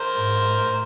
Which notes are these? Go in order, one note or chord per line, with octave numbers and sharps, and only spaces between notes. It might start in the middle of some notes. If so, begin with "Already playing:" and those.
Already playing: A#4 C5
G#2
A2